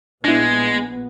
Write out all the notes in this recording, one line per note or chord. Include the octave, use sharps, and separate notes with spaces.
A#1 G#3 B3 D4 E4